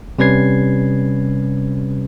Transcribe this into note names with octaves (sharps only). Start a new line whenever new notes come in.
C3 G3 C#4 B4 G#6 C7